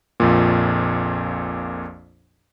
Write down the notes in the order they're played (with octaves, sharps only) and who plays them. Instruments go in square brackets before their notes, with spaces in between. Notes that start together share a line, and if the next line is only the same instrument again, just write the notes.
[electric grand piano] A#1 F2 A#2